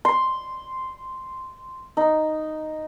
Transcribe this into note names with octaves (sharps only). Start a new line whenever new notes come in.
C6
D#4